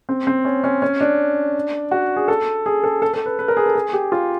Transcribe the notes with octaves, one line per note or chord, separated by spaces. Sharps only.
C4
C4
C#4
C#4
C#4
D4
F#4
G#4
A4
G#4
A4
A4
A4
B4
B4
A#4
G#4
A4
G#4
G4
F4